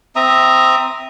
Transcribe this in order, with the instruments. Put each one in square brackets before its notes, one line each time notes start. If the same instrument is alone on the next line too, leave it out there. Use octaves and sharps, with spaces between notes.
[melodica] C4 E5 A#5 D#6